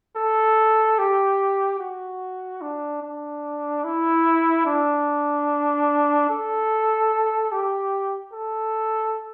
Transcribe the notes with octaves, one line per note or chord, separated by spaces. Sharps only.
A4
G4
F#4
D4
D4
E4
D4
A4
G4
A4